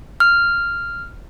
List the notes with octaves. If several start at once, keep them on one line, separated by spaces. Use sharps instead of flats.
F6